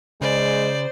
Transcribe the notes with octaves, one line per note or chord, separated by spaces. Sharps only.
C#3 G#3 C5 D5